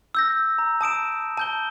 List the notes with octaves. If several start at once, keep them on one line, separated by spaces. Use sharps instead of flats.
E6 G6 A#6
A#5
A5 D#6 D7 E7
A5 G6 G7